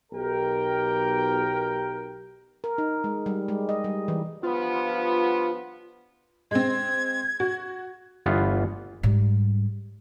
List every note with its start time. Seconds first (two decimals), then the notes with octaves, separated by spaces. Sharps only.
0.12 B1 G4 A#4 G5
2.64 A#4
2.78 D#4
3.04 G#3
3.26 G3
3.48 G#3
3.69 D#5
3.84 G3
4.08 E3
4.43 G2 F3 B3 F4
6.51 G#3 C4 G#6
7.40 F#4
8.26 G1 E3 B3 F4
9.03 G#2 G3